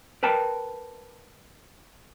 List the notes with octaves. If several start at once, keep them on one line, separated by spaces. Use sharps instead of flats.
A#4 B4 G5 A5